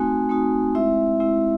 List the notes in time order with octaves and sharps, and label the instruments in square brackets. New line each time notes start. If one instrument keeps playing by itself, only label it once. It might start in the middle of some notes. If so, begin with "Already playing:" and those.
Already playing: [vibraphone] A3 C4 D#4 F#4 G#5
A3 C4 D#4 F#4
G#3 C4 E4 E5
G#3 C4 E4